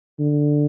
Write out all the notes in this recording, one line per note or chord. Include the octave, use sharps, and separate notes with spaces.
D3